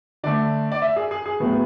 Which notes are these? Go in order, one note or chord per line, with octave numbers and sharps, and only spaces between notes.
D3 A3 D5
D5
E5
G#4
G#4
G#4
A2 F#3 B3